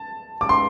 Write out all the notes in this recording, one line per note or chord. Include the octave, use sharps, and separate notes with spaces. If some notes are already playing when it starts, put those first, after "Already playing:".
Already playing: A5
D6
C6